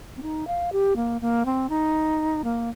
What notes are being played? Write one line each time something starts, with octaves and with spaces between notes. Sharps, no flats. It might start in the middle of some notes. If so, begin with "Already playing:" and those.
C4
D#4
F5
G4
A#3
A#3
C4
D#4
A#3